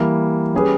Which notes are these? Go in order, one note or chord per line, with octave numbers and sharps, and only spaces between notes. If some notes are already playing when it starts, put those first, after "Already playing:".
Already playing: E3 G3 A#3
G3 C#4 G#4 B4